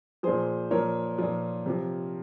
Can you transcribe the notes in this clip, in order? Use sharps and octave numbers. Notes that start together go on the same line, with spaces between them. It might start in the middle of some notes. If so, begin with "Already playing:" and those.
A#2 F3 G#4 C5
A#2 F3 A#4 C#5
A#2 F3
C3 F3